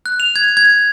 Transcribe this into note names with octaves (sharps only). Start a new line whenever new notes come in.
F#6
F7
G#6
G#6